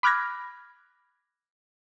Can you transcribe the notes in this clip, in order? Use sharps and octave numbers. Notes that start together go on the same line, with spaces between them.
B5 D6 F6 F#6 G#6 A#6